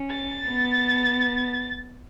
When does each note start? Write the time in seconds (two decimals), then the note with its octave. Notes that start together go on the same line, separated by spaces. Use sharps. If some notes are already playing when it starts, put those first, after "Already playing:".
Already playing: C#4
0.11 A6
0.48 B3